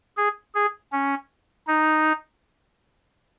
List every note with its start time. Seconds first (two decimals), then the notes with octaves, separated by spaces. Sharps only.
0.17 G#4
0.55 G#4
0.92 C#4
1.67 D#4